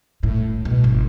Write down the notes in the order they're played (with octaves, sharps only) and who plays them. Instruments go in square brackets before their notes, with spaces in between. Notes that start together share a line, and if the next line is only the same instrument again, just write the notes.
[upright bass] A2
B2
G1